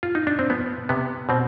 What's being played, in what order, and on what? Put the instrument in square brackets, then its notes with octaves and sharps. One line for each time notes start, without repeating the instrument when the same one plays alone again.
[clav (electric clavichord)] F4
D#4
D4
C4
F3 B3
C3 B3
B2 C4